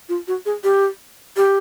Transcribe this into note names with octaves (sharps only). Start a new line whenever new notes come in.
F4
F#4
G#4
G4
G4